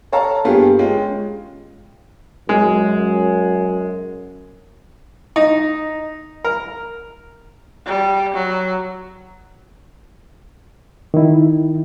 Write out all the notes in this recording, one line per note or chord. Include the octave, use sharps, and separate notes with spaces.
A4 C#5 F5 A5 A#5
G2 A#3 B3 F4 G4 G#4
G#3 C#4 F4 G5
F#2 G#3
D#4
A#4
G3
F#3
D#3 E4